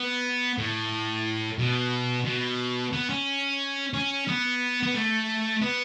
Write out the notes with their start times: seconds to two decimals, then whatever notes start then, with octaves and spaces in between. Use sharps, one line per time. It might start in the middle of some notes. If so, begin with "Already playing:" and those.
Already playing: B3
0.58 A2
1.58 B2
2.26 B2
2.93 B3
3.10 C#4
3.94 C#4
4.28 B3
4.83 B3
4.95 A3
5.62 B3